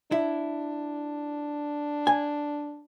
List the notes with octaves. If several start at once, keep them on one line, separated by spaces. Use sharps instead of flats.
D4 E4
G#5